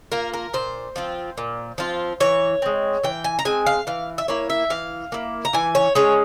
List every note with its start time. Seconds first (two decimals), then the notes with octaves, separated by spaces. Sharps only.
0.12 A#3 F4 A#4
0.34 A#4
0.54 A#2 C5
0.96 F3 C4 F4
1.38 A#2
1.78 F3 C4 F4
2.20 E3 C#5
2.62 G#3 C4
3.03 E3 G5
3.24 G#5
3.39 A#5
3.45 G#3 C4 G#5
3.67 F5
3.87 E3 F5
4.18 E5
4.28 A#3 E4 C#5
4.50 E5
4.70 E3 F5
5.12 A#3 E4
5.45 A#5
5.53 E3 G#5
5.75 C#5
5.95 G#3 C#4 C#5